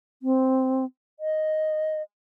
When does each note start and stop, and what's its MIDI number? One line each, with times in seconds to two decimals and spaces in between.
0.23 0.85 60
1.20 2.02 75